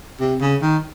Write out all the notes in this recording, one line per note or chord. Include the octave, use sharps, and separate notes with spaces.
C3
C#3
D#3